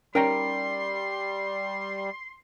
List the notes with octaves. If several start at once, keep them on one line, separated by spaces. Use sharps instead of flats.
G3 C#4 D#4 A#4 G5 A#5 C6